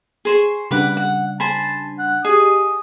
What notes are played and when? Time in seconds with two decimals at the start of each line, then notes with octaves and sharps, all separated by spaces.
0.25 G#4 C5 C#6
0.71 C#3 G3 D4 G4 B4 F#5
0.97 F#5
1.40 C5 G#5 A5 B5
1.99 F#5
2.25 G4 G#4 D#5 D#6